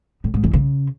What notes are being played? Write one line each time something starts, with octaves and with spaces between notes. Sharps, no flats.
A2
G#2
E2
C#3